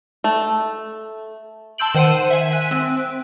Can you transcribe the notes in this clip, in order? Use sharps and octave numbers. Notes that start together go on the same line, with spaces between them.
A3
A5 C6 E6 G6 D7 F#7
D#3 C5 F#5 C6 D#7
E5 G#5
F#6 B6 D#7
C4